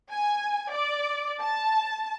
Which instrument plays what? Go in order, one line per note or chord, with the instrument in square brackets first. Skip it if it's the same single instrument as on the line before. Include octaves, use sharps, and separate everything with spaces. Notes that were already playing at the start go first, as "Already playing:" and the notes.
[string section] G#5
D5
A5